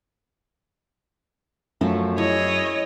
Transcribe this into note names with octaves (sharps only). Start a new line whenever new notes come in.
F#2 F3 A3 F#4
E4 G#4 C#5 D#5